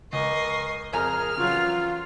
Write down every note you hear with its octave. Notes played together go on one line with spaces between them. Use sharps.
C#2 A#4 D#5 C#6 C7
F2 G#4 A#4 G#5 A#5 F6
C#3 E3 F#3 F4